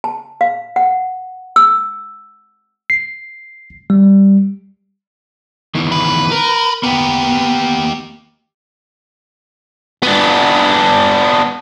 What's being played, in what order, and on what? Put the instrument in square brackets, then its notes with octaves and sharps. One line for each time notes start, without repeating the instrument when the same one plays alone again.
[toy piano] A5
F5
F#5
E6
[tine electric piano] C7
G3
[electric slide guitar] D#3 E3 B3
[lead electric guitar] B4
[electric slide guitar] A#4
[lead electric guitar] A#3 G4 [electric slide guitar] B3
[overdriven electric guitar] B3 D4